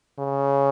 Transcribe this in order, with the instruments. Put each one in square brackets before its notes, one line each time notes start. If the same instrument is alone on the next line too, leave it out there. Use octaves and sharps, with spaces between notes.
[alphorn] C#3